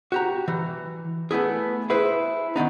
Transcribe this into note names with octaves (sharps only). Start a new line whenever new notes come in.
F#4 G4 A#5
E3
A3 B3 E4 G#4
E4 G#4 B4 C5
D#3 G#3 B3 D#4